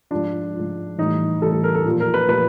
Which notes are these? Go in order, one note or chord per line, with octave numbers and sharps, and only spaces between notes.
G#2 F3 D4
G#2 F3
A2 E3 G3 D#4
A2 E3 G3 A4
A4
A#4
A4
A#2 F3
A#4
B4
A#2 F3 B4